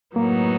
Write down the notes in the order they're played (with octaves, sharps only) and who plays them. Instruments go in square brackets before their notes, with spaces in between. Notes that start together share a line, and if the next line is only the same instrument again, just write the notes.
[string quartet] A2 F#3 B3 D#4 [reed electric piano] A#3